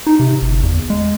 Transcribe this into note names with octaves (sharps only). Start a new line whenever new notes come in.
D#4
C3
G1
E2
G#3